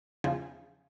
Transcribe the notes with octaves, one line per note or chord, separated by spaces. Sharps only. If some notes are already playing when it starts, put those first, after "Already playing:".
E2 C#3 F3